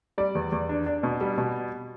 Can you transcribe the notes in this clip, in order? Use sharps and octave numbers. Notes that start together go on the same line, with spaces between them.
G3 D5
E2
E2
D4
D4
B2
G3
B2